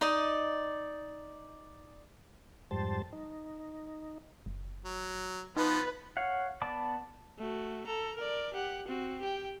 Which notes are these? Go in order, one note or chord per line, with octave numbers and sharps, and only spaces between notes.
D#4 D5 D#5
F2 G#2 G3 C5 A5
D#4
F#1
F#3
F3 B3 D#4 B4
C#5 F5 F#5
B3 D5 A5 B5 D6
A3 F#4
A4 A#5
A#4 D5
G4 F#5
C4 F#4
G4 G5